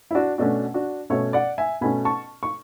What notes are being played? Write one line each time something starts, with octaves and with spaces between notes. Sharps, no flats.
E4
D4 F#4
B2 A3 C#4 D4 F#4
D4 F#4
B2 A3 C#4 C#5 E5
D5 F#5
E5 G#5
B2 A3 C#4 G#5 B5
A5 C#6
C#6